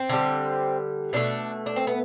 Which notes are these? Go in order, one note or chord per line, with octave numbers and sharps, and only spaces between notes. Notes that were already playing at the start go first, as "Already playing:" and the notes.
Already playing: C4
D3 G3
B2 A3 D4
D4
C4
B3